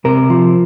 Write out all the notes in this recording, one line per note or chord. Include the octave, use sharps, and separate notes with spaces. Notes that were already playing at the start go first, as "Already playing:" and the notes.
C3 A#4
F3